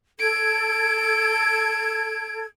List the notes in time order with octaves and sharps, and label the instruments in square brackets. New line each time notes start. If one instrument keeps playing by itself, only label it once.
[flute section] A4 G#6 [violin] D7